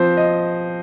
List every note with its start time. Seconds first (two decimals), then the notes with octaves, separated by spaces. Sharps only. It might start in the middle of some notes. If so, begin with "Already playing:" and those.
Already playing: F3 C4 C5
0.17 D#5